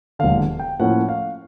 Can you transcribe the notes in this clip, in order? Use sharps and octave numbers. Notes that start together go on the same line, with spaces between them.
E1 D#2 D3 F5
G5
A2 F3 A#3 C#4 E4 F#5
F5